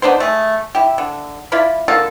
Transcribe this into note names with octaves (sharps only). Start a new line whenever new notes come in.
B3 D4 D#4 C5
A3 G#4
E4 G4
D3
E4 F4 D5 B5
D3 A#3 F4 A4